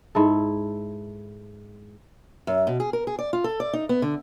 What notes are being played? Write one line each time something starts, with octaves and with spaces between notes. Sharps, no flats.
G#2 E4 A4
F#2
B2
G#4
A#4
G#4
D5
F4
A4
D5
D#4
B3
D3